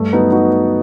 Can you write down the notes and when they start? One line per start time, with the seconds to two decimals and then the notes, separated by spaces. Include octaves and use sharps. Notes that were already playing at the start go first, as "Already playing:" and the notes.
Already playing: G2 A3
0.13 F#3 B3 D#4
0.32 D#4 F#4